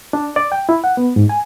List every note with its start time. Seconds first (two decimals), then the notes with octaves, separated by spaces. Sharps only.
0.13 D4
0.36 D5
0.52 G5
0.69 E4
0.84 F#5
0.97 B3
1.16 G#2
1.29 G#5